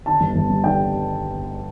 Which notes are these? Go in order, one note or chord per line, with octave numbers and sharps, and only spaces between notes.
D3 A5
G1
G1
G2
D3 G5